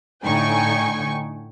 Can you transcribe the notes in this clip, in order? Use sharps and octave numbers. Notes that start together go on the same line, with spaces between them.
A2 D3 D#4 G5 G#5 C#6